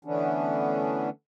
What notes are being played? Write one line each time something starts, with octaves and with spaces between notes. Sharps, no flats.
D3 E3 A3 B3 C#4 D4